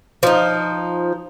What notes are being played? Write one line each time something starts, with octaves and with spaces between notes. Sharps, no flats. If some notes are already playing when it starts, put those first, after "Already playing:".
F3 D#4